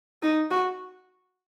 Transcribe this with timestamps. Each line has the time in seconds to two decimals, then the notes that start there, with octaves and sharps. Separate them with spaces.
0.23 D#4
0.51 F#4